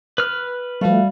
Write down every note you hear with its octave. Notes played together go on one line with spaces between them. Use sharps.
B4 F6
F3 G3 A3 F#4 E5 F5